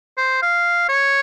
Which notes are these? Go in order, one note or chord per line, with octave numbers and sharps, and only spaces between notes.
C5
F5
C#5